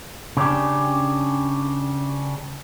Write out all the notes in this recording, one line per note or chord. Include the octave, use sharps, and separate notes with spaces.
C#3 C#4 D4 G4